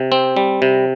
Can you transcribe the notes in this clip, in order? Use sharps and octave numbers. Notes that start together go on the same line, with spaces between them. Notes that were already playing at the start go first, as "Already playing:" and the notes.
Already playing: C3
C4
G3
C3